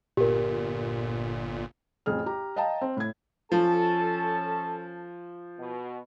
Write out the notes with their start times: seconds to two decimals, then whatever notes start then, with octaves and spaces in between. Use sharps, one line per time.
0.17 G1 A#2 G4 A#4
2.06 A1 F2 G#4 F6
2.26 G4 A#5
2.56 D#5 F5 G5 A5 A#5
2.81 C4
2.97 A2 G#6
3.52 F3 C#4 A4 A5
5.59 B2